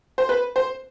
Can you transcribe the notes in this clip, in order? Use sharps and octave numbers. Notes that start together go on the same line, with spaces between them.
C5
B4
C5